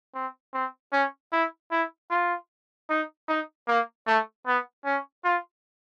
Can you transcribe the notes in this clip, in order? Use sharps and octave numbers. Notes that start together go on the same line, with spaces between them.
C4
C4
C#4
E4
E4
F4
D#4
D#4
A#3
A3
B3
C#4
F4